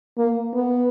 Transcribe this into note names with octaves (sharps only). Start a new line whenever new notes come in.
A#3
B3